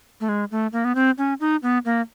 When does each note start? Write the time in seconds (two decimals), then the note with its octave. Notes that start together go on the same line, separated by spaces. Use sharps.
0.21 A3
0.29 G#3
0.51 A3
0.73 A#3
0.85 B3
0.95 C4
1.18 C#4
1.40 D#4
1.63 B3
1.85 A#3